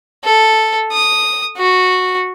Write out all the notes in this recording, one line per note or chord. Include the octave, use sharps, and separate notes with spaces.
A4
D#6
F#4